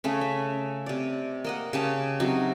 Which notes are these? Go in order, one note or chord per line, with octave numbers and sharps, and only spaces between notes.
C#3 A3 C#4
E5
C3 D5
A#3 D#5 F#5
C#3 G4 A5
C3 F#3 D#4